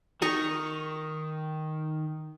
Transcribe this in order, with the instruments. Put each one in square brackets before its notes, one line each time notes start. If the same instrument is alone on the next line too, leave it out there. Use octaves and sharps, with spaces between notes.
[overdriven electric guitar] D#3 [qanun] D#4 A#5 C#6